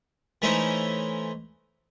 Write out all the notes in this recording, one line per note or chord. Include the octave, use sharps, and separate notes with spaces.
E3 A3 C#4 D#4 E4 C5